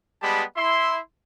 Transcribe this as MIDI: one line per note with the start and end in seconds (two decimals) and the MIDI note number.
0.22 0.43 55
0.22 0.43 56
0.22 0.43 59
0.22 0.43 67
0.22 0.43 81
0.22 0.43 83
0.57 1.00 64
0.57 1.00 76
0.57 1.00 84